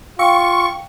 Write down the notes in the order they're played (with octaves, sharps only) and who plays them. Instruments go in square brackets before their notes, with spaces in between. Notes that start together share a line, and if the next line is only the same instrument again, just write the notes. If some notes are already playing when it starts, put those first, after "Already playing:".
[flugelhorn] F4 [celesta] F5 G5 E6 [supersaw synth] C#6